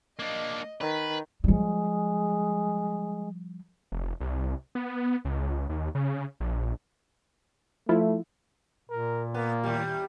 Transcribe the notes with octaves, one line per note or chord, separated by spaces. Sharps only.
A#3 D4 D#5
D#3 B4
F3 G3 G#3
F1
C2
B3
C#2
D#2
C#3
A#1
F3 A3 E4 F4
A#2 A#4
A#3 B3
D#2 G3